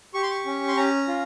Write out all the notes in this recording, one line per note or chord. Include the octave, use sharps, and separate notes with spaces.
G4 C#6
C6
C#6
C#4
C6
C#4 A#5
F4